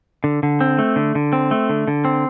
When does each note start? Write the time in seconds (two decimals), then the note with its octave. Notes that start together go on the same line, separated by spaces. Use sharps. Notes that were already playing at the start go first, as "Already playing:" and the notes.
0.24 D3
0.43 D3
0.61 C4
0.79 A3
0.96 D3
1.15 D3
1.33 C4
1.51 A3
1.69 D3
1.88 D3
2.05 C4